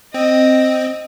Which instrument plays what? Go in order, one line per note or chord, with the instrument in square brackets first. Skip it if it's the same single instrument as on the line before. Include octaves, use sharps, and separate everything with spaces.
[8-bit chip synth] C4 [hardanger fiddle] D#5